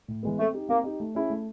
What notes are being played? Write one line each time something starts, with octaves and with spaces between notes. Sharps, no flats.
A2
E3 G#3 B3
A3 C4
D#4 G4
A#3 C4
D#4 G4
A3
C#4 E4 G#4
A3